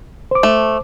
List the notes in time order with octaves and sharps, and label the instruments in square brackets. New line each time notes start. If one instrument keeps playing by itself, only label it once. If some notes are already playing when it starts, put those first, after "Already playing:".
[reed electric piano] C5 D6
[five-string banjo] A3